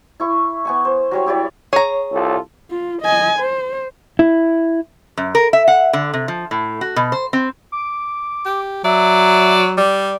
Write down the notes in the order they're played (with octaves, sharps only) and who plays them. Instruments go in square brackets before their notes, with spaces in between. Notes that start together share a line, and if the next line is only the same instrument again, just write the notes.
[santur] E4 C#6
B3 G#5 C#6
C5
F#3 G3 C#5
E4 G4 C#5 D5
[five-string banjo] G#4 A#5 [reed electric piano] C#5
[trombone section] C2 F4 A4
[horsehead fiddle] F4
D#5 G#5
C5
[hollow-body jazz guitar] E4
[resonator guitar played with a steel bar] F#2
A#4
E5
F#5
D3
C3
F3
A2
F#4
B2
C5
C4
[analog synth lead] D6
[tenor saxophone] G4
[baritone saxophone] F#3 [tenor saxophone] D5 [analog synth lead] E5
[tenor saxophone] G3 [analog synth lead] D5